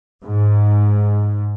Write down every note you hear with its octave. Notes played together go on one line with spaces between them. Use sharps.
G#2